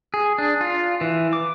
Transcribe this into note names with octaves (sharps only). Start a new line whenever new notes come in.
G#4
D4
F4
E3
D6